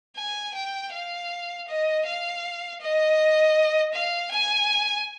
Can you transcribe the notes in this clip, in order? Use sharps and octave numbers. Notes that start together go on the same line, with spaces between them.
G#5
G5
F5
D#5
F5
D#5
F5
G#5